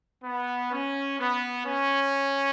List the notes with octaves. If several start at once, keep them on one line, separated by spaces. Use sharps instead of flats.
B3
C#4
B3
C#4